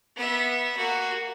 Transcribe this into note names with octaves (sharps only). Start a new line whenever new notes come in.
B3 E5
A#3 F#4